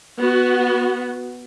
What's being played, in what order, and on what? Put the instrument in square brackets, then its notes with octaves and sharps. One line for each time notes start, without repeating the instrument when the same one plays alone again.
[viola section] B3 F#4